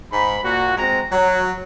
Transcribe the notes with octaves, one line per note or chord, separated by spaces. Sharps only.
G#2 B5
A#2 F#4
G#3 C4 A#5
F#3